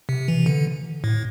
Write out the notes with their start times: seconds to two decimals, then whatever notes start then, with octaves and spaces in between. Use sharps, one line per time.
0.09 C3
0.28 E3
0.46 D3
1.04 A2